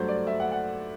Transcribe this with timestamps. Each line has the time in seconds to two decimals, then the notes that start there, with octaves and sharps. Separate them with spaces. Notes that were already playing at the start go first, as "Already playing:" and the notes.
Already playing: G2 F#3 A3 C5
0.08 D5
0.27 E5
0.40 F#5
0.52 F#5